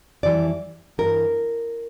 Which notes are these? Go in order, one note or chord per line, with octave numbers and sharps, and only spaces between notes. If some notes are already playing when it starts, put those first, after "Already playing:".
F2 E3 G3 D5
G2 E3 G3 A#4